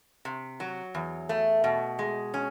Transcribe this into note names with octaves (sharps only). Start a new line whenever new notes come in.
C3
F#3
E2
A3
B2
G#3
C#4